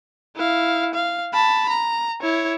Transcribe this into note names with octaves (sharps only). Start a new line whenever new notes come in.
E4 F5
F5
A5 B5
A#5
E4 C#5